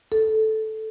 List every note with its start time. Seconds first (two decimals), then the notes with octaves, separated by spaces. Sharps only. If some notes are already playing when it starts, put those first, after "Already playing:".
0.12 A4